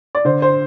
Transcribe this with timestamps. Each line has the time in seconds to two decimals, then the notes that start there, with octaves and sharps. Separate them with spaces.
0.15 D5
0.25 D3 C5
0.42 C5